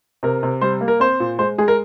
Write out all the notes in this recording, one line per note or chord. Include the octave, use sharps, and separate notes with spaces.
C3 A#4
C3
G3 C5
A#3
A#4
C4 C5
A#2
G#3 C5
G#3 G#4
A#4